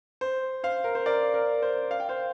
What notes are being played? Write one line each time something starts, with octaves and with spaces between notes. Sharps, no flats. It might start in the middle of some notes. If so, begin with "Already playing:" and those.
C5
C5 F5
A#4
C5
A#4 D5
A#4
C5
F5
G5
C5 F5